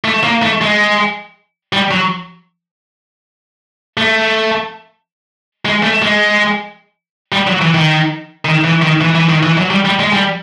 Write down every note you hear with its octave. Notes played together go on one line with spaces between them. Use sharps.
A3
A#3
A3
G#3
G3
F#3
A3
G#3
A3
G#3
G3
F#3
E3
D#3
D#3
E3
D#3
E3
E3
D#3
E3
F#3
G3
G3
G#3
G3